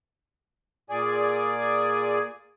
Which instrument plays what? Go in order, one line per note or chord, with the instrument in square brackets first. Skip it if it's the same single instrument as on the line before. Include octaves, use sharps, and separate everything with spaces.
[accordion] A#2 G#4 D5 G#5